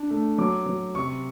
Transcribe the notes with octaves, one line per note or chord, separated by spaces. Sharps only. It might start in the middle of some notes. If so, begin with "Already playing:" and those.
Already playing: D4
A3
F#3 D6
F#3
C3 C#6